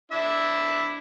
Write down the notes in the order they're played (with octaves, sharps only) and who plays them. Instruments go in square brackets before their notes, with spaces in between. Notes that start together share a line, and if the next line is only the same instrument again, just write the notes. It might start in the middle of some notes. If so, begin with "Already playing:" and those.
[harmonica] D4 E4 E5